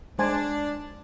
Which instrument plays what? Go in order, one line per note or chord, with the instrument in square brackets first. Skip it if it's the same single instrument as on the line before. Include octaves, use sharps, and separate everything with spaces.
[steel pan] G#3 C5 G#5 [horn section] D4